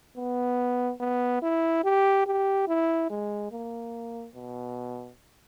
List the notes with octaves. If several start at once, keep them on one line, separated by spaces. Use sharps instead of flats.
B3
B3
E4
G4
G4
E4
G#3
A#3
B2